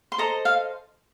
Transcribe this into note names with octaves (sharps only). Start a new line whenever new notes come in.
C6
A4 C5 D#5 A#5
F5